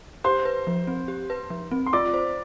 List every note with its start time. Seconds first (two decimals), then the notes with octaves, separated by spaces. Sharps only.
0.24 G4 C5 C6
0.45 B4
0.67 F3
0.87 C4
1.08 G4
1.30 B4
1.50 F3
1.71 C4
1.86 C6
1.93 F4 D5 D6
2.14 C5